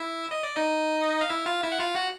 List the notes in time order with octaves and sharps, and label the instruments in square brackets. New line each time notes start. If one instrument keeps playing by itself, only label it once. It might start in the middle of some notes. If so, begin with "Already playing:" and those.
Already playing: [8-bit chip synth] E4 E5
D#5
D5
D#4 D#5
F5
E4 E5
F4 F5
E4 E5
F#5
F4 F5
F#4 F#5